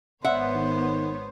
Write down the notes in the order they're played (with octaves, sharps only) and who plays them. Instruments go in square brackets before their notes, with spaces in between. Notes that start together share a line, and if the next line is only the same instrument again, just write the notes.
[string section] G#1 B3 C#5 [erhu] C5 [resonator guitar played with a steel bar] E5 F#5
[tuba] D#3